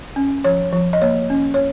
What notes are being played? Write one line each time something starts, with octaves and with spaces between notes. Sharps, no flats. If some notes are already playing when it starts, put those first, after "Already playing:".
C#4
F3 C#5
F3
D#5
A#3 C#5
C#4
C#5